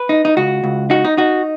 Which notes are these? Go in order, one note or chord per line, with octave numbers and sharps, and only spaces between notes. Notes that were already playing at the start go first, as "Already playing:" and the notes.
Already playing: B4
D#4
D#4
C#2 F#4
C#2
D#4 F#4
D#4
D#4 F#4